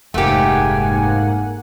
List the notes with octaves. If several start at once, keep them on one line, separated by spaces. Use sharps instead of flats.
F1 G#2 A3 A#3 G4 F#5 G#5